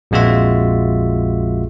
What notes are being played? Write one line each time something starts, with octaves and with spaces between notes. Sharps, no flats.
A#1 F2 G#3 F4 F#4 E5